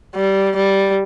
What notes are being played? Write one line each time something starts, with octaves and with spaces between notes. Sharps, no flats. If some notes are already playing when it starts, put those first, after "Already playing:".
G3
G3